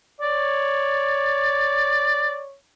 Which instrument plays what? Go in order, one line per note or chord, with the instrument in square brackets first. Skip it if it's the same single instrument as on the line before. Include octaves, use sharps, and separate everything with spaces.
[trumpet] C#5 [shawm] D5